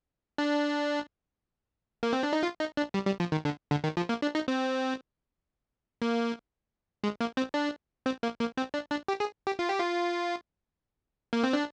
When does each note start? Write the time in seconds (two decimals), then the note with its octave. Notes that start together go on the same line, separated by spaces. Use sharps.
0.38 D4
2.03 A#3
2.13 C4
2.23 D4
2.33 D#4
2.43 F4
2.60 D#4
2.77 D4
2.94 G3
3.06 G3
3.20 F3
3.32 D#3
3.45 D3
3.71 D3
3.84 D#3
3.97 F3
4.09 A#3
4.22 D4
4.35 D#4
4.48 C4
6.02 A#3
7.04 G#3
7.21 A#3
7.37 C4
7.54 D4
8.06 C4
8.23 A#3
8.40 A#3
8.57 C4
8.74 D4
8.91 D4
9.08 G4
9.20 G#4
9.47 G4
9.59 F4
9.69 G4
9.80 F4
11.33 A#3
11.43 C4
11.53 D4